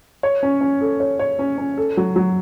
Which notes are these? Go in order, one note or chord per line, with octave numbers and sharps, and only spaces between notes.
C#5
C#4
C#4
A4
C#5
C#5
C#4
C#4
A4
F#3
F#3